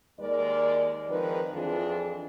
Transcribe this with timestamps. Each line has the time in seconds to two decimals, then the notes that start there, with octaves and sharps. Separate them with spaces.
0.19 D#2 G#3 A#4 D5
1.08 D#3 F3 G#3 C4 B4
1.52 F2 E3 D4 F4 G#4